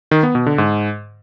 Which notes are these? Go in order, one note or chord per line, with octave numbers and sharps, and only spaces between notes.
D#3
B3
B2
D3
G#2